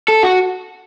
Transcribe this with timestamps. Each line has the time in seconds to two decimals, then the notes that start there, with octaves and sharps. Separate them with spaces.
0.08 A4
0.23 F#4